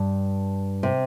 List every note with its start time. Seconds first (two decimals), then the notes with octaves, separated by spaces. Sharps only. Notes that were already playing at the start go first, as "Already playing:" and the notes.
Already playing: G2
0.83 C3